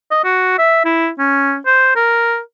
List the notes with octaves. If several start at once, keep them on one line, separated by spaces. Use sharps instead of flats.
D#5
F#4
E5
E4
C#4
C5
A#4